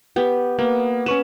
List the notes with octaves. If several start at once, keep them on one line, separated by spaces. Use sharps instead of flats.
B3 G4
A#3 B3
C#4 B4 C#6 E7